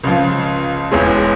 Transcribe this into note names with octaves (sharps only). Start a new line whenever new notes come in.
C#2 C#3 F3
E1 E2 E3 G#3 C#4